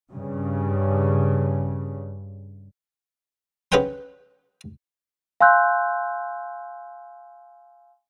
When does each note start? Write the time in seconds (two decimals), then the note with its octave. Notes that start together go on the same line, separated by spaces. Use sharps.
0.11 G2 C#3
3.72 C#4 G#4 B4 F#5 G5 C6
5.41 F5 G#5 C6 E6 F#6 G6